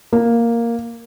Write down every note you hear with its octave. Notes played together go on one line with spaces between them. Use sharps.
A#3